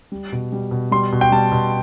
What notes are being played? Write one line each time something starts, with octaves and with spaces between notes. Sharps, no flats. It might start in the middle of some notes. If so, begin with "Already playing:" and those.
G3
B2
G3
B2
G3 C6
B2
G5
G3 A5
B2